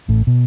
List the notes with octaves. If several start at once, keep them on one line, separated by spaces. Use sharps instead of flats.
A1 A2
B2